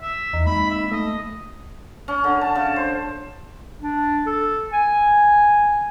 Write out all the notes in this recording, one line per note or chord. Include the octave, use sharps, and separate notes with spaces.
E5
E2 D#4
G#3 A#3 B5
E5
A3 D#5
C#4
D3
A5
C#3
C5
D4
A4
G#5